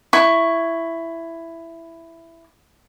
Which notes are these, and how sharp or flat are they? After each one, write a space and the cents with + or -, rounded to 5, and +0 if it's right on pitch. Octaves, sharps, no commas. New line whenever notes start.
E4 +10 C#6 +0